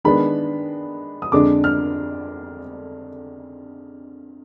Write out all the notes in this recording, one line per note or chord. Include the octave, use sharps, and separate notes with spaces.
D#3 G#3 B3 D4 B5
D#6
F2 D3 G#3 D4 D6
F6